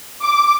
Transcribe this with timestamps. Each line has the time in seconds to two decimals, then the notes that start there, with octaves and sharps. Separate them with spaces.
0.22 D6